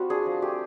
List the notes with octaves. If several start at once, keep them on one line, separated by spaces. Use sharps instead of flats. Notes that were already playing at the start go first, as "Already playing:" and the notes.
Already playing: G3 C4 F4 F#4
D4 G#4
F3
A3 G4